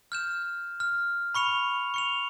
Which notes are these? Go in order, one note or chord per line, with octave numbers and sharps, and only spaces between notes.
F6 G6 E7
F6
B5 C#6 C#7 F7
C#6 C#7 F7